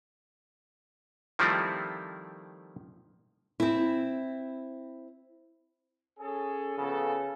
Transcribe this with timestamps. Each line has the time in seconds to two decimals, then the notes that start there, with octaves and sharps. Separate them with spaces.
1.39 D#3 F3 G3 A3 C4 E4
3.60 C4 E4
6.19 C#4 G#4 A4
6.78 C#3 F3 B3 A4